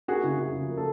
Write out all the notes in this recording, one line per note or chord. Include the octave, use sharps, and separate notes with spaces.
A#3 F#4 G#4
C#3 E4 F#4
C#3 F#4 G#4
F3
A#3
A4